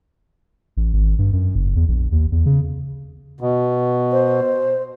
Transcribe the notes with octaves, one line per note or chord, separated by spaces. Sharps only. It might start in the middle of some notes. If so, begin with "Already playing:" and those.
A1
G#1
G2
F#2
F#1
E2
A#1
D#2
E2
C#3
B2
C5